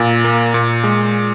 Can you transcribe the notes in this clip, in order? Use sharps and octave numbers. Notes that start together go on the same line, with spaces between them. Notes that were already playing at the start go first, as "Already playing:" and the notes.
Already playing: A#2
A#3
A#2
G#3